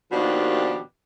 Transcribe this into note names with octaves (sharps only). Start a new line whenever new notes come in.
D#2 B2 D#3 F3 D4 G4